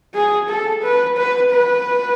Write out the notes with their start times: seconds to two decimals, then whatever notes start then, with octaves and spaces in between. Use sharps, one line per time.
0.14 G#4
0.49 A4
0.83 B4
1.17 B4
1.51 B4